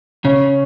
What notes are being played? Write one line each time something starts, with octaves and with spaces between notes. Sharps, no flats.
C#3 C#4